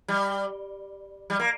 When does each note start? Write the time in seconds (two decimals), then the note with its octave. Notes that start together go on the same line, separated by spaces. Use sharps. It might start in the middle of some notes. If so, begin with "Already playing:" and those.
0.08 G3
1.30 G3
1.39 A#3